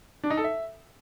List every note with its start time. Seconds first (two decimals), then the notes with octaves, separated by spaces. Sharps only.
0.24 D4
0.30 D#4
0.37 A4
0.44 E5